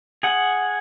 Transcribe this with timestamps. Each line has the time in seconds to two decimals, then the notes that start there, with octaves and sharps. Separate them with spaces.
0.23 G#4 F#5